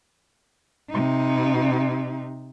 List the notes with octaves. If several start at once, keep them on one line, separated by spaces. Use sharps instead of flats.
C3 D#4